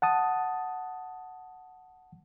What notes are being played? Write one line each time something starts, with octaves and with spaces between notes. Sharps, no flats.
F#5 A5 D#6